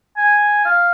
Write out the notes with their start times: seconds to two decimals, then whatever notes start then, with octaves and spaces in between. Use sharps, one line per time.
0.17 G#5
0.65 F5